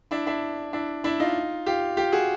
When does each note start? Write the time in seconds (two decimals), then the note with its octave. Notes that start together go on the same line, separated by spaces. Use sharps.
0.11 D4 E4
0.27 D4 E4
0.73 D4 E4
1.04 D4 E4
1.20 D#4 F4
1.66 F4 G4
1.97 F4 G4
2.12 F#4 G#4